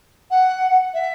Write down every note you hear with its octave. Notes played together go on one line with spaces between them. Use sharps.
F#5
E5